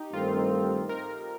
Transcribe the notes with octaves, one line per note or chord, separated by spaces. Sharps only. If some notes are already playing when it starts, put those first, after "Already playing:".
Already playing: D#4 G4
G2 D#3 A3 C4 F4
A#4